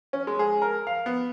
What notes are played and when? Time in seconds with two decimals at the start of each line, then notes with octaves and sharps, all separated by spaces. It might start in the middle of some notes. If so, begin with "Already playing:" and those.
0.13 C#4
0.27 G#3
0.39 G#4
0.62 A#4
0.87 F5
1.06 B3